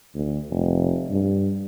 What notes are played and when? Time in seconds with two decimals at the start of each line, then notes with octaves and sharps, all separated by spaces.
0.15 D2
0.50 F1
1.10 G2